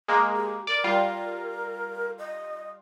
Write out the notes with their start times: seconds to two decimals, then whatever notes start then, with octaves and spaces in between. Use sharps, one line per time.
0.08 G#3 A#3
0.36 G4
0.67 A#4 D5
0.84 G3 F4
2.19 D#5